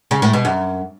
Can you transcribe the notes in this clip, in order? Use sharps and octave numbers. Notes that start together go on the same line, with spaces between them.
C#3
A2
B2
F#2